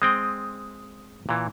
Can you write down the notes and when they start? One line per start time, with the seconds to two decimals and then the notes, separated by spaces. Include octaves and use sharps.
0.02 G#3 C4 G5 D#6
1.29 A#2 E3